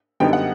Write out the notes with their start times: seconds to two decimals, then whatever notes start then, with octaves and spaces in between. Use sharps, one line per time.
0.20 F#2 D3 G3 B3 D#4 G5
0.33 F#5